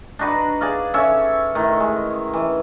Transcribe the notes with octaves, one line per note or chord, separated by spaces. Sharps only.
D4 D#4 F#4 B4
G#4 D5 F5
C#4 A4 C#5 E5
A2 D#3
G#3
E3